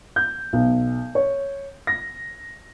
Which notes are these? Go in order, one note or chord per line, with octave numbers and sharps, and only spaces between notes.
G6
B1
C#5
A#6